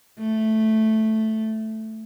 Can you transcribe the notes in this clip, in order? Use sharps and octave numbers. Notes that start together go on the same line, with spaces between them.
A3